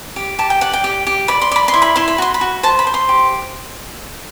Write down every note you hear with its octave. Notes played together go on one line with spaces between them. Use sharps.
G4
G4 A5
G5
D5 F#5
G5
G4
G4
D5 B5
C6
D5 B5
C6
E4
B5
E4 C6
B5
F#4 C6
B5
F#4
C5 A5
B5
C5
C6
G4